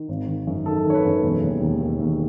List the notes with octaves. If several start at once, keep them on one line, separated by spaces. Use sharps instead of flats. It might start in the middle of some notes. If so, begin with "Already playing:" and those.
Already playing: D#3
G#1
D#3
F#2
D#3 A4
D#3
C#5
B4
F#2
E1
D#2
D#2
D#3
D#2